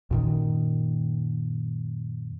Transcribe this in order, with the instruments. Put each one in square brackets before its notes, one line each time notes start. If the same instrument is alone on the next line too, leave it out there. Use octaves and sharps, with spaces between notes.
[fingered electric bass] F#2 A#2 D#3